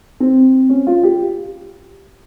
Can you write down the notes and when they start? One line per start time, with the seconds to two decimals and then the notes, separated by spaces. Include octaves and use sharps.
0.20 C4
0.69 C#4
0.87 F4
1.03 G4